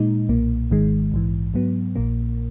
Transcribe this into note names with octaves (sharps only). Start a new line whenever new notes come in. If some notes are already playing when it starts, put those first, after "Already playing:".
Already playing: A#2 G#3 D#4
B1 A#2 A#3
G#1 G#2 D#3 G#3
A#1 G#2 E3
G#2 F#3 B3
A#1 A#2 A#3